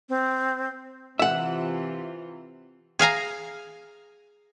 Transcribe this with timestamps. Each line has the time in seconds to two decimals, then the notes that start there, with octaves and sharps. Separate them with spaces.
0.09 C4
1.19 C3 E3 F4 E5 F#5
2.99 G#4 F5 G#5 A#5